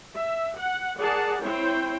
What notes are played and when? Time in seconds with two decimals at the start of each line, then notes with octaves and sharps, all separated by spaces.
0.15 E5
0.58 F#5
1.00 G#4 A#4 D5 F#5 A5
1.42 C4 E4 C5 C#5 G5